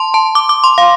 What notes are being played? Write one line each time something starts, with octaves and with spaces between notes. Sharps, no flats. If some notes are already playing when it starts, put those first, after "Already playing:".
Already playing: A5 C6
A5
D6
D6
C6
F5